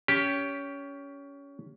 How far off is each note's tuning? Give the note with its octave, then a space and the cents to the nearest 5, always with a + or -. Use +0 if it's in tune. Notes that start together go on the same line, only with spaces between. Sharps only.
C#4 +20 G4 +0